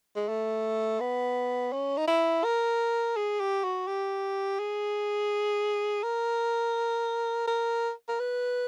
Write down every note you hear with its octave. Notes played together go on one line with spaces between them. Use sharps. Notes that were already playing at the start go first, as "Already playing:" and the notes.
G#3
A3
B3
C#4
D#4
E4
A#4
G#4
G4
F#4
G4
G#4
A#4
A#4
A#4
B4